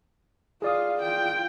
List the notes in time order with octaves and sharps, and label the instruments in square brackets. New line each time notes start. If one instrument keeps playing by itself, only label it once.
[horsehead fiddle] F4 F5 [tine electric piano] G#4 D5 D#6
[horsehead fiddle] F4 G5